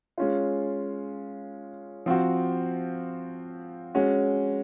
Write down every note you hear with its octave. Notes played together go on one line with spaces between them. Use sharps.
G#3 C#4 F4
F3 C4 F#4
G#3 C#4 F#4